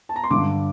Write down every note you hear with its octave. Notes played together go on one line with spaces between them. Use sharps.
A5
A#5
C6
G2 D3 D6